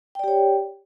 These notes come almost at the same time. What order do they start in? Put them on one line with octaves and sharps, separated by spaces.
G5 D5 G4 C#5